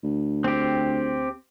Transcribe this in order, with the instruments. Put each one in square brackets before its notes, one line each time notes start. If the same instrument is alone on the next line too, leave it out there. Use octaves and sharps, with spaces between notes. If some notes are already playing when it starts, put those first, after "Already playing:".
[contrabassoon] D2
[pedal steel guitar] C4 G4